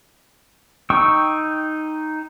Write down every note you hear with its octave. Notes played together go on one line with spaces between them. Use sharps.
D#4 G5 C#6 E6